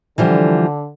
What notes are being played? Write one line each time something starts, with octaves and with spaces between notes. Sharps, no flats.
D3 E3 F3 G3